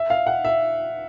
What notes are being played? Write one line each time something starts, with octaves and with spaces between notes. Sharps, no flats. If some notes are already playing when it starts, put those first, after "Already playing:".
Already playing: E5
F5
F#5
E5